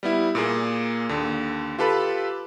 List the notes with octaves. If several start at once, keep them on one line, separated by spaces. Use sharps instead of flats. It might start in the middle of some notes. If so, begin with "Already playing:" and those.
G3 B3 E4
A#2 A#3 G#4
D#2 D3
F4 G4 A4 B4 B5